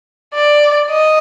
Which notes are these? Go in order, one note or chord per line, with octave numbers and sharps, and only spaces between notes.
D5
D#5